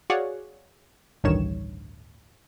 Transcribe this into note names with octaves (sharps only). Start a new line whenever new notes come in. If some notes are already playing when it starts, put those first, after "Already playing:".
F#4 G#4 C#5 D5 F5 F#5
A1 D2 G2 D#3 C#5 E7